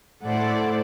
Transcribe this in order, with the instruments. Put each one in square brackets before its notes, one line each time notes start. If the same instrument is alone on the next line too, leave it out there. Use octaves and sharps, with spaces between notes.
[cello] A2 E4 [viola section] A4 D5 [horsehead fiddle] C5 F#5